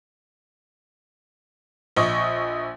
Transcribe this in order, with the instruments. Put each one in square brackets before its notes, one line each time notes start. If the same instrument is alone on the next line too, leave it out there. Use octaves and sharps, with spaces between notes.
[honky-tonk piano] A#1 D#5 C#6